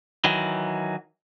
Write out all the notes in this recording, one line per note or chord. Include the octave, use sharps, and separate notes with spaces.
D#3 E3 F#3